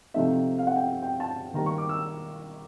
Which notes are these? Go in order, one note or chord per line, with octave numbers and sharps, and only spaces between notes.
C3 F3 A3 C4 D#4 E5
F5
F#5
G5
G5
A5
D#3 G3 A#3 A#5
C#6
D6
E6